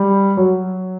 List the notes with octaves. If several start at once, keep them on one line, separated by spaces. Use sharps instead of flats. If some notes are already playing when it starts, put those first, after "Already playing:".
Already playing: G3
F#3